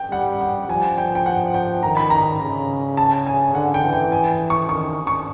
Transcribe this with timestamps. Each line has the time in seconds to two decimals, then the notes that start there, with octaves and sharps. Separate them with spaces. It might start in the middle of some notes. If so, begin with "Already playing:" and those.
Already playing: G5
0.11 G3 F#5
0.41 F#5
0.68 F3 G#5
0.98 G5
1.15 G5
1.26 F#5
1.54 G5
1.83 D#3 A#5
1.97 B5
2.10 A#5
2.41 C#3
2.97 A5
3.27 G#5
3.54 D3 F#5
3.74 G5
3.84 E3
3.93 G5
4.12 G#5
4.31 G#5
4.50 C#6
4.69 D#3 C#6
5.07 C#6